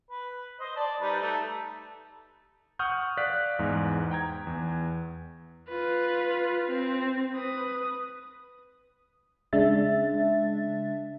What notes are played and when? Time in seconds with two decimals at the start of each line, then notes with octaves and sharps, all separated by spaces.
0.10 B4
0.60 C5 D#5
0.76 D5 A5
1.01 G3 D#4 B4
1.21 A3 D#4
2.79 F#5 C#6 D#6 F6 G6
3.17 D5 F5 F#6 B6
3.59 E2 G#2
4.11 G5 A#5 G#6
4.47 E2
5.69 F4 B4
6.69 C4
7.33 B4 D#6
9.53 C#3 G#3 D4 E5 A6